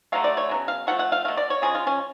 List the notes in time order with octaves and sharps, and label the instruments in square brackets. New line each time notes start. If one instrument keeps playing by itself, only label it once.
[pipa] D3 F#3 A3 F5
D5
C#5
C#3 F#3 B3
F5
F3 A3 F#5
F#5
F5
B2 A3 F5
D5
C#5
C#3 F3 G#3 G#4
F4
C#4